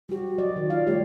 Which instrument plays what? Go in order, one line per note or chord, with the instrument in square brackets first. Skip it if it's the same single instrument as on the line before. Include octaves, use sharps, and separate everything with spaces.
[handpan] G3 G4 [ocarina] F#4
[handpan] F#3 D5 D#5
D#3
[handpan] F4 F5 [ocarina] D5
[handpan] G3 A3 G4 [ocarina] C#5